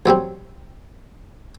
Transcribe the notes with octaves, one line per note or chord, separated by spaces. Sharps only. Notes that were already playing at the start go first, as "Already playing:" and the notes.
A1 F#3 G3 C4